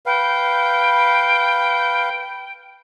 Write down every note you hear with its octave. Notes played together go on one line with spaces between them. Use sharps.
B4 F5 G5